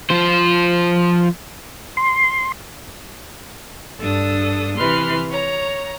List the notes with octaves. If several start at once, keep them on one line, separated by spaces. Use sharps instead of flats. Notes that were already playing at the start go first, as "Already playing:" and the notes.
F3 C5
C6
G2 D4 A4 D#6
C3 E3 B4 C6 F6
C#5 A#5